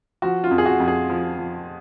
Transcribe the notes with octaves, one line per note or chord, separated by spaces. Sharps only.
F3 F#4
F4
F2
G#4
F#4
F2
G#4
F3
F3